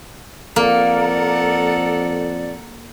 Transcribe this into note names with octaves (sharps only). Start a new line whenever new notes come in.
F2 A#3 A4 A#4 D5 F#5